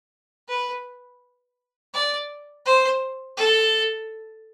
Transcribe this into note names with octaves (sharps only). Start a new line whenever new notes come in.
B4
D5
C5
A4